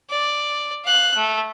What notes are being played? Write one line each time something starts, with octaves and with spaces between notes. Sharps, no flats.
D5
F5 F#6
A3